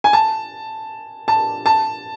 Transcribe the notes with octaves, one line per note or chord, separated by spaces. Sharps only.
G#5
A5
A5
A5